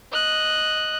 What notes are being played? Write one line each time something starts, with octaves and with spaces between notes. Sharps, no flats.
D#5 F#6